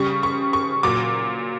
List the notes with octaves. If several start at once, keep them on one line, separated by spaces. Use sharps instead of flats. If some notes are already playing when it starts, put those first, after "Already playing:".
Already playing: C#3 G3 C#6
C#6
C#6
A#2 F#3 D6